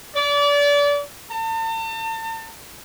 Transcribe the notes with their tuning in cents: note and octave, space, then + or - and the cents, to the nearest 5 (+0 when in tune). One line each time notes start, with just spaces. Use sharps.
D5 -30
A5 +40